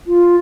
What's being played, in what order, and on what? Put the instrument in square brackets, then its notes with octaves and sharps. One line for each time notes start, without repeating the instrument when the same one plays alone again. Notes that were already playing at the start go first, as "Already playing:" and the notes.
[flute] F4